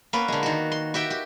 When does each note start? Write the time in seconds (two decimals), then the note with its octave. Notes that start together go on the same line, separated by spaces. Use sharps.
0.13 A#3 B3 C#4 B4
0.28 D3 G#3
0.43 D#3 F#4
0.72 C6
0.94 F#4 G4 E5 G5
1.10 G4